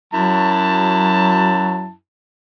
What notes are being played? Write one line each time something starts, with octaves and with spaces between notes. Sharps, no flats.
F#2 F#3 E4 A5